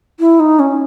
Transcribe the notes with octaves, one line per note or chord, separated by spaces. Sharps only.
E4
D#4
C#4